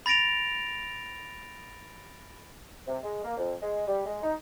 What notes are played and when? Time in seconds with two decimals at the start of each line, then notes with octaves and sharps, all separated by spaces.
0.06 B5 A6 A#6 D7 F7
2.88 C3
3.03 G#3
3.24 A#3
3.37 F2
3.62 G#3
3.87 G3
4.05 G#3
4.23 D#4